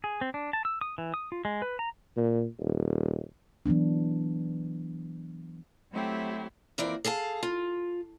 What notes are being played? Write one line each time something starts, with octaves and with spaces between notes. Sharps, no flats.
G#4
C4
D4
A5
E6
D#6
E3
D#6
F4
G#3
B4
A#5
A#2
D#1
E3 F#3 B3 D4
F#3 A3 C4 E4 G4
F2 E3 A#3 C4 A#4 D5
G#4 A4 F5 A5
F4